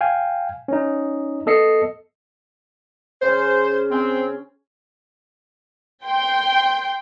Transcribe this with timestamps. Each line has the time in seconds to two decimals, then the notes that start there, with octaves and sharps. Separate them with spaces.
0.01 F5 G5 G#5
0.68 C#4 D#4
1.46 B3 A4 D#5 C7 C#7
3.22 C#3 C#4 C5
3.92 C4 G#5
6.06 G5 C6